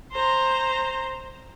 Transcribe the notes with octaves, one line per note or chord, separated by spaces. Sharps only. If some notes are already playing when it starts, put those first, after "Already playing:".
C5 A#5